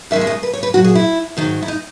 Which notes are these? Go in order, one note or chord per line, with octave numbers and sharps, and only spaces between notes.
D#2 C#3 G#3 E5
E5
D#5
B4
C#5
B4
A#2 F#3 F#4
G#4
E4
G#2 D#3 F#3
E4
D#4